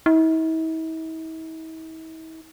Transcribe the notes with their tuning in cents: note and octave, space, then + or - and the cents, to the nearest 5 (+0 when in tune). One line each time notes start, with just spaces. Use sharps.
E4 -45